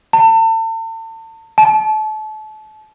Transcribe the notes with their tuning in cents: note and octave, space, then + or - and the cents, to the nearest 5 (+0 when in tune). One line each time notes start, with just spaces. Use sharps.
A5 +40
A5 -30